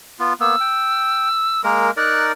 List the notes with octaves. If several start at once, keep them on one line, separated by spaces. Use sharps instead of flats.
B3 F4
A#3 B3 E6
G5
G#3 A#3 A#4 A#5
D#4 A#4 D5 F#6